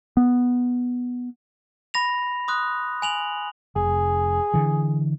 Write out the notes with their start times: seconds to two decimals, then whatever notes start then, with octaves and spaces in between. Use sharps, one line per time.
0.17 B3
1.94 B5 A#6 F7
2.48 C6 D#6 F#6
3.02 G#5 F7 F#7
3.76 F1 G#4
4.54 D3 E3